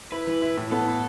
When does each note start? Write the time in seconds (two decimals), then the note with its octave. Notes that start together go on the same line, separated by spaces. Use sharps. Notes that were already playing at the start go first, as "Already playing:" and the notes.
0.12 E4 B4
0.27 E3
0.42 E4
0.57 A2
0.72 B3 A4
0.87 E4